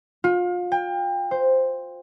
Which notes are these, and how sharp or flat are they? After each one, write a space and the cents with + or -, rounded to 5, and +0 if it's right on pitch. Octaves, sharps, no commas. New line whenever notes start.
F4 +30
G5 +30
C5 +0